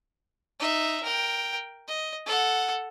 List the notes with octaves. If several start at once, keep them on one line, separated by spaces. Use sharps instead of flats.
D#4 E5
A#4 G5
D#5
A4 F#5